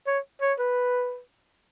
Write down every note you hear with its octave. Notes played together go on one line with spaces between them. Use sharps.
C#5
C#5
B4